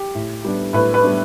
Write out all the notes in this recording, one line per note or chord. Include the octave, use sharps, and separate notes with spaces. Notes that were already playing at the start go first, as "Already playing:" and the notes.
Already playing: G4
A2
G3 B3 D4
A2 B4
B4
G3 B3 D4